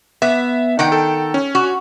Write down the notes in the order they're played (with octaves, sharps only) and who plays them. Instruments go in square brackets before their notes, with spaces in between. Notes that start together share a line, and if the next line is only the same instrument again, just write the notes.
[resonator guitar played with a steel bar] B3 [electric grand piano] E5
[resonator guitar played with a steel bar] D#3 F#5 G5
[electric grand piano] A4
C#4
[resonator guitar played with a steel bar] F#4